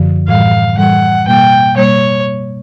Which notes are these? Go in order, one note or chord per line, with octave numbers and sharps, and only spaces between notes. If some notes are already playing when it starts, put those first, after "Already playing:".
Already playing: F#2 D3 F3
A2 E3 G3 F5
A2 E3 G3 F#5
B2 G3 A#3 G5
B2 G3 A#3 C#5